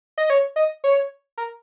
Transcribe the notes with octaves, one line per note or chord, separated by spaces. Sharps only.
D#5
C#5
D#5
C#5
A#4